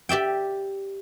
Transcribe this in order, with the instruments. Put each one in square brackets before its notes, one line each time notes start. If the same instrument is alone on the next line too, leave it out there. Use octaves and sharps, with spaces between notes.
[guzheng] G4 D5 E5 G5